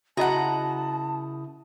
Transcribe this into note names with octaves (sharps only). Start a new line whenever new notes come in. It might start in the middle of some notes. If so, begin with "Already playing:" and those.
C#3 E4 F#4 D#5 F#5 A5 A#5 D#6